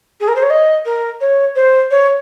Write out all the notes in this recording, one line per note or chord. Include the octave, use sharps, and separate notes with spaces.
G#4
A#4
C5
C#5
D#5
A#4
C#5
C5
C#5